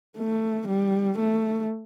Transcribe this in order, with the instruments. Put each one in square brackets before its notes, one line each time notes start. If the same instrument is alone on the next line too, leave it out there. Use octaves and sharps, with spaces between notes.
[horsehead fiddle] A3
G3
A3